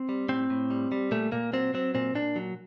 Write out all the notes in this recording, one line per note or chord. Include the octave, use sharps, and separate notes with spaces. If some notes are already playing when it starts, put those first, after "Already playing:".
Already playing: C4
G3
A2 C4
A2
G3
G3
A#2 A3
A#2 A#3
F#3 C4
F#3 C4
A#2 C4
A#2 D4
F#3